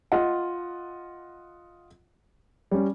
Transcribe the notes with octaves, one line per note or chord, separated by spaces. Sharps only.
F4 D#5 F#5
G3 C#4